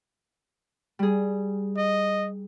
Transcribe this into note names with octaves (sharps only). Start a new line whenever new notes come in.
G3 G#4
D#5